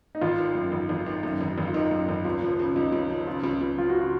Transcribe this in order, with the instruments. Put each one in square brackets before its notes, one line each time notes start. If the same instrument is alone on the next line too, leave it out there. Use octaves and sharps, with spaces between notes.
[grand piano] D#4
[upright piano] G#1 [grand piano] F4
[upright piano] D#3
F#2
G#1
G#1
D#3
F#2
G#1
G#1
[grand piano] F4
[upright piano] D#3 [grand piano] D#4
[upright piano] F#2
G#1
[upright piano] C#2 [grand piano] F4
[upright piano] F3
C#3
[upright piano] C#2 [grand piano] D#4
[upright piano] C#2
F3
[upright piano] C#3 [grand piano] F4
[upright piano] C#2
C#2
[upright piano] F3 [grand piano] F4
[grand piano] F#4
[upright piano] C#3
[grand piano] F4